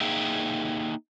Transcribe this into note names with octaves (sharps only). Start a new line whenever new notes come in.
A#3 D#4 G#4 E5 G5